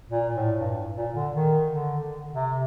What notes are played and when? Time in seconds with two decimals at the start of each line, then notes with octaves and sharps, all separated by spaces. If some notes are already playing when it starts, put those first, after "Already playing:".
0.09 A#2
0.34 A2
0.59 G2
0.96 A#2
1.15 D3
1.34 D#3
1.71 D3
2.34 C3